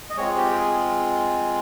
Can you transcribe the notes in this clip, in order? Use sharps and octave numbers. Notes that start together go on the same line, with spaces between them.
D#5
G#3 C4 F4 C#5
G4
G#4